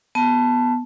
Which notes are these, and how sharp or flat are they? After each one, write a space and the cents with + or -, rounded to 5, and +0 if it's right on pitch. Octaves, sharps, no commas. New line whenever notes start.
B3 -5 A5 +0